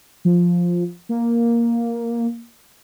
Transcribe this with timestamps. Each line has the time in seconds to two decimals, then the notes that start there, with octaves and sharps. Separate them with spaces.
0.25 F3
1.09 A#3